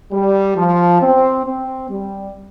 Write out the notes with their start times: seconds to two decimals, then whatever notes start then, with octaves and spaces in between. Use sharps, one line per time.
0.11 G3
0.56 F3
1.01 C4
1.45 C4
1.89 G3